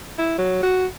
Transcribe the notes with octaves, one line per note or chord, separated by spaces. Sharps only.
E4
F#3
F#4